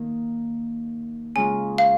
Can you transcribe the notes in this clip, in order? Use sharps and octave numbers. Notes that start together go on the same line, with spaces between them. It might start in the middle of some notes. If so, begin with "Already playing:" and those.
Already playing: D#3 A#3 D#4
C#3 G#3 F4 G#5
F5